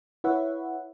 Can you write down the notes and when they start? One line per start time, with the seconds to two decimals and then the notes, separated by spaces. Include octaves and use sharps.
0.24 E4 B4 C#5 E5 F#5